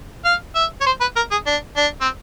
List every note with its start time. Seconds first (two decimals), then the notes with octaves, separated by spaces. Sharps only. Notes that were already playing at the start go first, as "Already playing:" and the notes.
0.25 F5
0.55 E5
0.81 C#5
0.86 C5
1.01 B4
1.16 A#4
1.31 G#4
1.46 D4
1.77 D4
2.01 C4